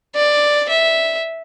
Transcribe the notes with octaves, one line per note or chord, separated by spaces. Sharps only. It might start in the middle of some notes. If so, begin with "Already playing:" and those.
D5
E5